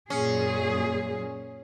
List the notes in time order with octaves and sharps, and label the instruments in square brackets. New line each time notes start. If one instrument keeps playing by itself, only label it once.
[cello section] F#2 A#2 G#4 [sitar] C#4